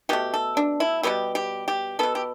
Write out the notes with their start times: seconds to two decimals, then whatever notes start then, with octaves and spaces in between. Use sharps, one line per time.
0.09 B2 A3 G4
0.34 A4
0.57 D4
0.80 E4
1.03 B2 G3 B3 G4
1.35 G4
1.68 G4
1.99 B2 B3 A4
2.15 G4